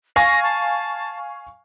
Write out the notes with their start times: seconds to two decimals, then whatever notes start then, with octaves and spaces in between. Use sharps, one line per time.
0.16 F5 G#5 C#6 A#6
0.43 A5